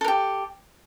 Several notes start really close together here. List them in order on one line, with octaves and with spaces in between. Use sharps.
A4 A#4 G4